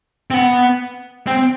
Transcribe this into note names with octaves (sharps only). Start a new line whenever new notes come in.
C4
B3
C4